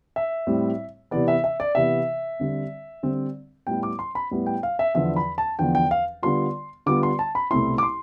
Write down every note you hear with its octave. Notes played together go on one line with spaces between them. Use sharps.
E5
A2 G3 C4 E4
C3 E3 B3 D5
E5
E5
D5
C3 E3 B3 E5
D3 G3 C4
D3 G3 C4
A2 G3 B3 E4 G5
D6
C6
B5
A2 G3 B3 E4
G5
F5
E5
E2 D3 F3 B3 E5
B5
A5
E2 D3 F3 B3 G5
G5
F5
D3 G3 B3 F4 C6
D3 G3 B3 F4 D6
C6
A5
B5
C2 B2 A3 C4 E4 C6
D6
C6